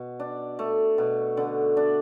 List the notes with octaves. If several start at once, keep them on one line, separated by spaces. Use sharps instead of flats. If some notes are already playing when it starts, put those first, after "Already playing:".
Already playing: B2
D4
A3
B2
D3
D4